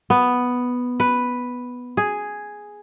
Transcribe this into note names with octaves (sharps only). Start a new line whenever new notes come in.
B3
B4
G#4